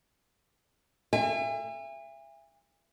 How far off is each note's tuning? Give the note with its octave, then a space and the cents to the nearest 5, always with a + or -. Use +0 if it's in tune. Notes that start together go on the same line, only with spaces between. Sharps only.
E5 +30 G#5 -40